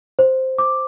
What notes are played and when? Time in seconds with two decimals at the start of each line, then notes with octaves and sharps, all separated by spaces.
0.19 C5
0.58 D6